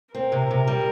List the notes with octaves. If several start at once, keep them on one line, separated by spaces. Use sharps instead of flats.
C4 A#4
C3
C3
G3